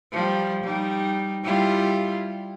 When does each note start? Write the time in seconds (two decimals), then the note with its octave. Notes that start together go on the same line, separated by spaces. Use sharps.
0.12 F3 G3
0.64 G3 D#4
1.44 G3 E4 F4